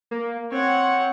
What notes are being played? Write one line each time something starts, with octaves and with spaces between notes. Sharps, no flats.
A#3
C4 C#5 F#5